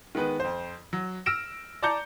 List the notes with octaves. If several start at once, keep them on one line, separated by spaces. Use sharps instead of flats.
D#3 G#3 B3 B4
F2 C5
F#3
E6 F6 A#6 D7 E7
D5 A5 A#5 D6 G6 C#7